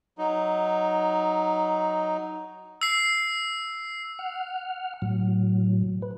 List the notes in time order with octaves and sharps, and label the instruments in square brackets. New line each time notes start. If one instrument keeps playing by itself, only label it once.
[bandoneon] F#3 D#4
[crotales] E6 C7
[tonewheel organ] F#5 F6
A2 F#3
B4